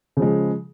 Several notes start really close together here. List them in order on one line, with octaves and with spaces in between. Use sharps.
C#3 F3 G#3